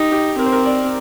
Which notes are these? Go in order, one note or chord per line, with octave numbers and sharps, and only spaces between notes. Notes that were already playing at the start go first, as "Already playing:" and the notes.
Already playing: D#4 G4
G4
C4 A#4
C5
A#4
D5